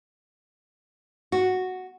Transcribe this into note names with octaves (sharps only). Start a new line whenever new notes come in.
F#4